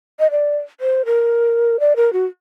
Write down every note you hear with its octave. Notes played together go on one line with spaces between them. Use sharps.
D#5
D5
C5
A#4
D5
A#4
F#4